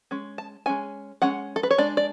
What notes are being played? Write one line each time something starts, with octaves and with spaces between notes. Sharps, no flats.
G#3 C#4
A5
G#3 C#4 G#5
G#3 C#4 F#5
A4
B4
C#5
G#3 D4 D5
D5